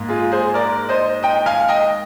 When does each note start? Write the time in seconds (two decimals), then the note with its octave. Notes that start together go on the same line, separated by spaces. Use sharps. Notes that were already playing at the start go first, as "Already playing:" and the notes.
Already playing: G#2 A#3
0.09 F4 G#4
0.32 G#4 C5
0.54 A#4 D5
0.89 C5 D#5
1.23 D#5 G5
1.46 F5 G#5
1.69 D#5 G5